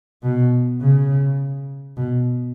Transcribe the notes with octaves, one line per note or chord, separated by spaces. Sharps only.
B2
C#3
B2